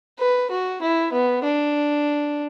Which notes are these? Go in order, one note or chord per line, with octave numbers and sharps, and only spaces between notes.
B4
F#4
E4
B3
D4